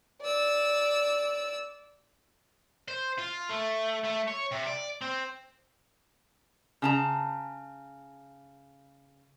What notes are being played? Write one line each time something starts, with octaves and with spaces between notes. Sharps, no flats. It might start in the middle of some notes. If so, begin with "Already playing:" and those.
D5 E6
C5
F4
A3
A3
C#5
C3
D5
C4
C#3 A5 A#5